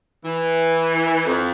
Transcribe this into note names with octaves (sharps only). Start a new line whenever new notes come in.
E3
F2